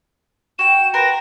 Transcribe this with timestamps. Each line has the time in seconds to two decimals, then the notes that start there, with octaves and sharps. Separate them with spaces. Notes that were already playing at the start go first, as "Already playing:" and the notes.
0.59 F#4 G5 E7
0.94 A#4 B4 C6 A#6